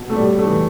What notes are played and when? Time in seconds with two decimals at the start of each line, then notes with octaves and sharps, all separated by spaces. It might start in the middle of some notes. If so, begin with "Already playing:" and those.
Already playing: B2
0.09 A3
0.16 A2 G3
0.39 A3
0.47 E3